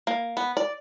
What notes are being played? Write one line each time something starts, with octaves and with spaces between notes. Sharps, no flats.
A#3
B3
D5